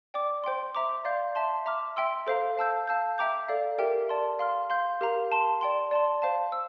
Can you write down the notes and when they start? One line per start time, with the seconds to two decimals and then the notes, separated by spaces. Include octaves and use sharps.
0.14 D5 G5 D6
0.44 C5 G5 C6
0.75 E5 A#5 D6
1.05 D5 F5 C6 G6
1.35 E5 A5 C6
1.66 E5 A#5 D6 F6
1.96 E5 G5 C6 E6
2.27 A4 C5 F5 A#5
2.58 F5 A5 E6 G6
2.87 F5 A5 E6 G6
3.18 E5 G5 A#5 D6 G6
3.49 A4 D5 F5
3.78 G4 A#4 E5 G5
4.09 D5 A5 C6
4.39 F5 C6 F6
4.70 F5 C6 G6
5.01 G4 A#4 F5 A#5
5.31 F5 A5 C6
5.61 D5 G5 C6
5.91 D5 A5 C6
6.22 C5 F5 A5
6.52 E6